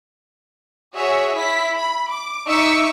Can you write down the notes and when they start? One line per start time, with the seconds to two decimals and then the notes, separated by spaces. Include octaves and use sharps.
0.95 F#4 G#4 C#5 E5
1.34 E4 B6
1.77 B5
2.09 D6
2.46 D#4 E5 C#6 D6 E6 C#7